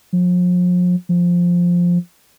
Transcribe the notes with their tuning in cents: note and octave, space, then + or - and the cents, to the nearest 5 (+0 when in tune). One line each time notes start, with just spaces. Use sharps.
F3 +40
F3 +5